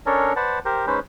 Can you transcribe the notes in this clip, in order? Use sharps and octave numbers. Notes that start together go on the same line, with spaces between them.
C#4 D4 A4 A#4 C#5
B4 C5 D5 F#5 A5
G4 A#4 C5
G#3 C#4 D#4 B4 C5